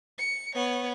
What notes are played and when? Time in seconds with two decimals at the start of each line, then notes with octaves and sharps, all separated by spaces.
0.19 C#7
0.55 B3 C#5